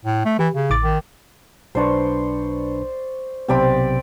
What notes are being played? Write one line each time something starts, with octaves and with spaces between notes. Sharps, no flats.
A2
A3
E3 G4
C#3
A1 D6 A6
D#3
B1 D4 B4 C5 D5 C#6
B1 C3 B3 C4 D5 B5